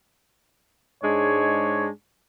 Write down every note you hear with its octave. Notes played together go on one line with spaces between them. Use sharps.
G#2 G#3 D4 C#5